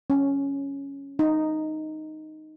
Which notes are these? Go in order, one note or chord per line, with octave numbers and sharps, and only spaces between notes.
C#4
D#4